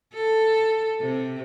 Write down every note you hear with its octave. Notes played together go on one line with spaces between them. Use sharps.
A4
C3